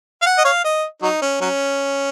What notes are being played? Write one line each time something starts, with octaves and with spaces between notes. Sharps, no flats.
F5
F#5
D#5
C#5 F5
D#5
F#3 D#4
C#4
F#3 C#4